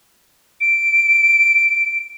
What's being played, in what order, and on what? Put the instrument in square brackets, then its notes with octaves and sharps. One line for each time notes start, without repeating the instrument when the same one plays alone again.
[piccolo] D7